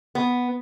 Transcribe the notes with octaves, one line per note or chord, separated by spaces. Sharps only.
B3